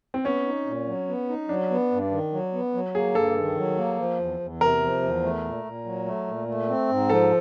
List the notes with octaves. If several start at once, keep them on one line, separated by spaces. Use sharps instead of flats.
C4
B3 C#4
D#4
A#2
F#3
B3
D#4
F#3 D4
B3
G2
D#3
F#3
B3
F#3
A#3 G#4
G2 A4
D#3
F#3
A#3
F3
E2
E2
C3 A#4
F3
E2
A3
A#2
A#2
F#3
A3
A#2
A3
C4
G#2
F3 A4